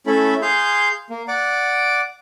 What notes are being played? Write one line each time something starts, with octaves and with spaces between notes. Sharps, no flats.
A3 C#4 E4 A4 E5 B5
G#4 F5 C6 G6
A#3
D5 F#5 D6